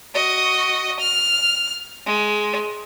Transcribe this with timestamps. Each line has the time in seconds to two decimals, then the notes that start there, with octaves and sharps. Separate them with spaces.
0.14 F#4 D#5
0.99 F6
2.06 G#3